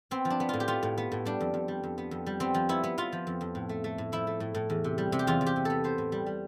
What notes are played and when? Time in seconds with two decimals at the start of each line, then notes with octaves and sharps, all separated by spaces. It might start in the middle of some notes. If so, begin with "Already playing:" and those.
0.11 B3 C4
0.25 F3
0.30 D4
0.40 B3
0.49 A2 F4
0.60 G4
0.68 B3 F4
0.83 A2
0.98 B3
1.12 A2
1.25 G3 D4
1.41 F2
1.54 F2
1.68 G3
1.84 F2
1.98 B3
2.11 F2
2.26 G3
2.40 B3 C4
2.54 F3
2.69 B3 E4
2.84 B3
2.98 B3 F4
3.12 F3
3.27 F2
3.41 F2
3.55 A2
3.69 A3
3.84 A3
3.98 A2
4.12 F3 E4
4.27 A3
4.40 A2
4.55 A2
4.70 E2
4.84 C3
4.98 G3
5.12 C3
5.19 G4
5.27 E2 F4
5.41 E2
5.46 G4
5.56 C3
5.65 B3 A4
5.84 B3 C5
5.98 A2
6.12 G3
6.26 G3